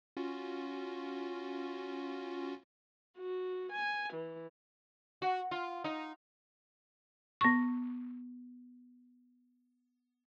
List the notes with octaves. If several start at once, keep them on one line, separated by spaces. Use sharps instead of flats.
C#4 F4 F#4
F#4
G#5
E3
F#4
F4
D#4
B3 C#6